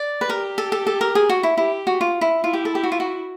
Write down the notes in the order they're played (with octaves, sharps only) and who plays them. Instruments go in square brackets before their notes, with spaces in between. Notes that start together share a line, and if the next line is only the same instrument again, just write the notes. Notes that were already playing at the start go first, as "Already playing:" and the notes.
Already playing: [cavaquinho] D5
B4
[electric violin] G4 [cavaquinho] A#4
[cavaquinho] A4
A4
A4
A#4
G#4
F#4
E4
[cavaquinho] E4 [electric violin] G4
[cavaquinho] F#4
F4
E4
[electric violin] E4 [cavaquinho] F4
[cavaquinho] G4
A4
G4
F#4
F4
F#4